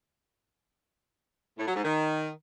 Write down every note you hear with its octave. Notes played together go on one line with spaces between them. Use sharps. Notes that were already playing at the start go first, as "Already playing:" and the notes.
A2
F#3
G#2
D#3